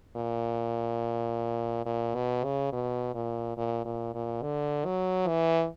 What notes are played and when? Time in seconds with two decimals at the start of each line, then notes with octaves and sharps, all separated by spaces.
0.16 A#2
1.86 A#2
2.15 B2
2.44 C#3
2.72 B2
3.15 A#2
3.57 A#2
3.85 A#2
4.14 A#2
4.42 D3
4.85 F#3
5.27 E3